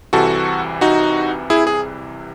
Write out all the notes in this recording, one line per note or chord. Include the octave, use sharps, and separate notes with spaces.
C2 C3 E3 F#4 A4
D#4 F#4
E4 G#4
G#4